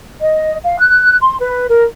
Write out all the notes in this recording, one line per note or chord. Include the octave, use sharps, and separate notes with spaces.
D#5
F5
F#6
C6
B4
A#4